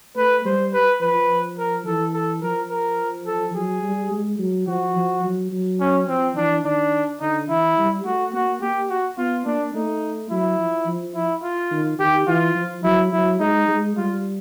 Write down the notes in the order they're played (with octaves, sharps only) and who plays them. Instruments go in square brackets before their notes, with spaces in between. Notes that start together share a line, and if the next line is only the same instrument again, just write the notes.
[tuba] A3 [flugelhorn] B4
[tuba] G3 [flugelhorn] C5
[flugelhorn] B4
[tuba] F3 [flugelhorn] B4
[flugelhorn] A#4
[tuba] E3 [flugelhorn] A4
[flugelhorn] A4
[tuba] F3 [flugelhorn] A#4
[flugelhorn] A#4
A4
[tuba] F#3 [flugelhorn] G#4
[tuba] G3
G#3
F#3
[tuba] F3 [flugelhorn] F#4
[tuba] F3
F#3
F#3
[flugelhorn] C#4
[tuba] F3 [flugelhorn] C4
[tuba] E3 [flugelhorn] D4
[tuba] D#3 [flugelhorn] D4
[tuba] D3 [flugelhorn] D#4
[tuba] E3 [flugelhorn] E4
[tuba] G3
[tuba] A3 [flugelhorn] F#4
[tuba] A#3 [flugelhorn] F#4
[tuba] A#3 [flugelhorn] G4
[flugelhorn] F#4
[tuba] B3 [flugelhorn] F4
[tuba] A#3 [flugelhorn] D4
[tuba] A3 [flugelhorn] D#4
[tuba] F#3 [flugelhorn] E4
[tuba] F3
F3
[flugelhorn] E4
F4
[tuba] D#3
[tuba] D#3 [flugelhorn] G4
[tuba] E3 [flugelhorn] F4
[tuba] F3
[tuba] F#3 [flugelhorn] E4
[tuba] F#3 [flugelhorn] E4
[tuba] G#3 [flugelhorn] D#4
[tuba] G#3
[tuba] G3 [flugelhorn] F4